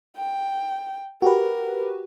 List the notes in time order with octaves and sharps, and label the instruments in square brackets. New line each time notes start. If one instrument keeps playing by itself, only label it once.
[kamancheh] G5
[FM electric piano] F#4 G4 B4 [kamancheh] A#4